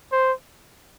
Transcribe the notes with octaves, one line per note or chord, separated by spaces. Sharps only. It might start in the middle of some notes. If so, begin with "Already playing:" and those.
C5